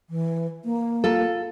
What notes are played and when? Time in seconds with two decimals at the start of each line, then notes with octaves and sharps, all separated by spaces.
0.10 E3
0.64 A#3
1.04 F4 A4